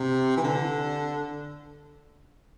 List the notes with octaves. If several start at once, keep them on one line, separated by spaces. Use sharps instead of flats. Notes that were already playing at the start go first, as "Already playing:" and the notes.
Already playing: C3
E3
D3